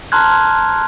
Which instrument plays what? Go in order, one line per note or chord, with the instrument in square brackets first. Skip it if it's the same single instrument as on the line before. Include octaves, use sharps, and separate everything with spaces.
[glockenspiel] A5 A#5 C6 F6 F#6 G#6